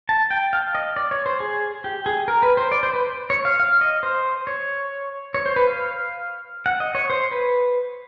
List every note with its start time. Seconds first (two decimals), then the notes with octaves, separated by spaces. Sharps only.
0.09 A5
0.31 G5
0.53 F5
0.75 D#5
0.96 D5
1.11 C#5
1.26 C5
1.40 G#4
1.84 G4
2.06 G#4
2.28 A#4
2.43 B4
2.57 C5
2.72 D5
2.83 C5
2.94 B4
3.30 C#5
3.45 F5
3.60 F5
3.81 D#5
4.03 C5
4.47 C#5
5.34 C#5
5.46 C5
5.56 B4
5.67 F5
6.66 F#5
6.80 D#5
6.95 C#5
7.10 C5
7.31 B4